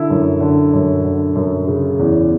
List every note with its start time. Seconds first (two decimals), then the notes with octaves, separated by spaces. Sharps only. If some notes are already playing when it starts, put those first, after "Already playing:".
Already playing: D3 E4
0.10 F#2
0.41 D3
0.73 F#2
1.04 D3
1.35 F#2
1.68 C#3
1.99 E2